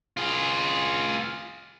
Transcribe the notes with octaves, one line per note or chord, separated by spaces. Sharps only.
F4 G#4